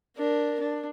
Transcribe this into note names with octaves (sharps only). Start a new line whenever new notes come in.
D4 A#4
D4